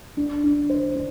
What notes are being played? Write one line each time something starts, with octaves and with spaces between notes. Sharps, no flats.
D4
D4
C5
D4